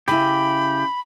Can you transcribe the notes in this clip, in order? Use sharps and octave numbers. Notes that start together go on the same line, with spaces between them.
C#3 E4 G4 B5